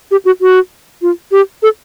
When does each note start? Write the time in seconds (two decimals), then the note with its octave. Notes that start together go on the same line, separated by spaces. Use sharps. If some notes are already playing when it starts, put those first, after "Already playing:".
0.11 G4
0.25 F#4
0.41 F#4
1.02 F4
1.32 G4
1.63 A4